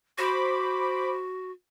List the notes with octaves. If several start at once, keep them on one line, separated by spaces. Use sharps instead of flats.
F#4 C5 B5 D6